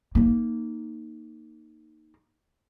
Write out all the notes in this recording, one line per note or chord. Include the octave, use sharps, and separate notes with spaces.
A#3 D#4